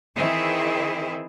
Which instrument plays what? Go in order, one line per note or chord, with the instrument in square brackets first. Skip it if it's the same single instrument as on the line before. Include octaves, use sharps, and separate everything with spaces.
[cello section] D#3 E3 C4 E4 G#4